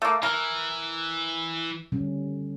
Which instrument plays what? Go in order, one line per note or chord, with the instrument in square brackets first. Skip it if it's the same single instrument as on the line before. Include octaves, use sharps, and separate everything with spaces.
[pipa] A3 A#3
[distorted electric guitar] E3 [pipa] A#4
[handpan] D3 G3 C#4